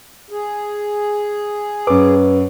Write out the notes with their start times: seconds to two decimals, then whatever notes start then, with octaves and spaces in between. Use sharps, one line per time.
0.30 G#4
1.87 F#2 B4 D6